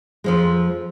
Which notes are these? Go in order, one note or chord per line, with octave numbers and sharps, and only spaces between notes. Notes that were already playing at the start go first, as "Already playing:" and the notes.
F2 F3 G#3